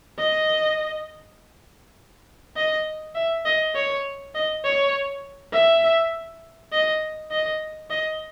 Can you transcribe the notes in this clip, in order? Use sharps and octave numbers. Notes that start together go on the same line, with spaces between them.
D#5
D#5
E5
D#5
C#5
D#5
C#5
E5
D#5
D#5
D#5